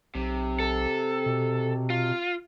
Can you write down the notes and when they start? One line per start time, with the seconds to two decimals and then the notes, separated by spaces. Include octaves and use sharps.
0.15 B1 C3
0.60 A4
1.26 B2
1.90 F4